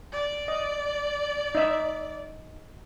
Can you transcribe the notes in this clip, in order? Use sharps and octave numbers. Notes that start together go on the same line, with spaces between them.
D5
D#5
D#4 E5